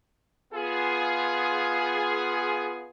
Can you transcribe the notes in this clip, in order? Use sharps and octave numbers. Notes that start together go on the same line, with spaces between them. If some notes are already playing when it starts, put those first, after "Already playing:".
B3 F4 G#4